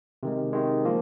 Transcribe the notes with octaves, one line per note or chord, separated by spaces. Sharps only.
C3 D#3 G#3
C3 D#3 G#3
F3 A#3 F4